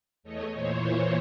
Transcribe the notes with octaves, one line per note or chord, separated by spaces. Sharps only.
E2 A3 C#5 D#5
A#2 E3 C5 C#5